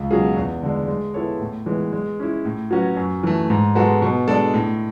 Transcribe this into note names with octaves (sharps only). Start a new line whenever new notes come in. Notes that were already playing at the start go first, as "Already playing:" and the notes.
Already playing: C#2
B2 F#3 C#4 G#4
E2
D3 G#3
G#3
B3 E4 A4 C#5
A2
E3 G#3 B3
G#3
C#4 E4
A2
F#3 C#4 F#4 B4
F#2
E3 A3
G#2
G#3 B3 F#4 A4
B2
G#3 D4 A4 D5
A2